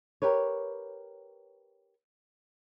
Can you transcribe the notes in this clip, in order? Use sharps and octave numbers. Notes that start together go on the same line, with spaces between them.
G4 A#4 B4 C#5